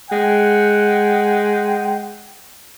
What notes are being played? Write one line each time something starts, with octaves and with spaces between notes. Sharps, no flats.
G#3 F#5 G5